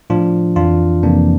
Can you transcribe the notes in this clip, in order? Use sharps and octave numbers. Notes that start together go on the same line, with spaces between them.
A2 F3 D4 F4
F2 E3 D4 F4
F2 C3 E3 A#3 D4